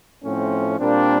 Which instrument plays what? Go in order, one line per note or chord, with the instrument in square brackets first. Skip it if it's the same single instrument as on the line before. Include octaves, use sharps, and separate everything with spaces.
[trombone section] A2 F3 A3 C4 C#4
A#2 G3 A#3 C4 D4